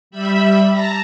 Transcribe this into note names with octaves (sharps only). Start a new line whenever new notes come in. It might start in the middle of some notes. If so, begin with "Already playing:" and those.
G3 E5 B5
A5 A#5 A#6